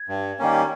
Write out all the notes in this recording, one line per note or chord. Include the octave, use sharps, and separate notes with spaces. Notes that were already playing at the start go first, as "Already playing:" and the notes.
Already playing: G#6
G2
D#3 G3 A#3 C#4